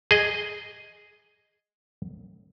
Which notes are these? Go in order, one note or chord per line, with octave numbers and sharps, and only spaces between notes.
G#4 D#5